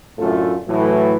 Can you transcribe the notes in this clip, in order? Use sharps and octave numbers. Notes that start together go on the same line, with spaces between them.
F#2 A2 D3 A3 F4 A4
A2 E3 F#3